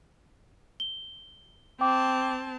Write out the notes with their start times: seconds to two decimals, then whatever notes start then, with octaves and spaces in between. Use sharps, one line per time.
0.80 G7
1.81 C4 G5 A5 D6